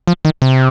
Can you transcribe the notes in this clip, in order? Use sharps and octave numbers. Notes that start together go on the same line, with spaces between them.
F3
D#3
C3